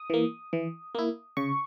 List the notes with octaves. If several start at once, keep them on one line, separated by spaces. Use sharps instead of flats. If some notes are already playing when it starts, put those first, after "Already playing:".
Already playing: D#6
E3 A#3
E3
A#3 E4
C#3 C#6